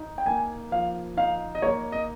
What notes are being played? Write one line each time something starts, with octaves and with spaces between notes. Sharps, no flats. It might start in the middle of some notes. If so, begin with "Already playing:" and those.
Already playing: D#4
G5
A#3 G#5
F3 F5
D#4 F5
D#5
A#3 C#5
D#5